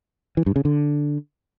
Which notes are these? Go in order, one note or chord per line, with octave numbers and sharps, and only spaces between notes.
E3
G2
C#3
D3